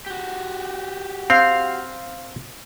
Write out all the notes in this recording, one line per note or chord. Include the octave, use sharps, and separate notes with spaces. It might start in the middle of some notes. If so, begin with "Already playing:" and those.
F#4 G4
C4 F5